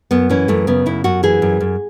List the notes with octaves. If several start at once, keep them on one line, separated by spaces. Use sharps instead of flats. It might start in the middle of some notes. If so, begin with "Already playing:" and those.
F#2 B3
E3 C#4
F#2 A3
C#3 B3
F#2 E4
F#2 F#4
E3 G#4
F#2
F#2